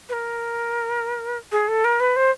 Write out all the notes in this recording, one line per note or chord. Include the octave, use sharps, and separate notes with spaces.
B4
A#4
G#4
A4
A#4
B4
C5